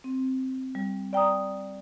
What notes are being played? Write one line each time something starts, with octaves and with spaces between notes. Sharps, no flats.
C4
G3
D5 G5 A#5 D#6